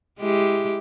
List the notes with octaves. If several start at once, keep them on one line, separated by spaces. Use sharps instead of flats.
G#3 E4 G4